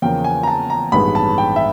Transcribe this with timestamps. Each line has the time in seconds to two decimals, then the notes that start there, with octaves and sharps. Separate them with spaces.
0.02 E2 C#3 F3 A#3 G5
0.24 G#5
0.43 A#5
0.48 A5
0.70 A#5
0.92 A1 G2 D#3 G#3 B3 B5
1.15 A5
1.38 G5
1.56 E5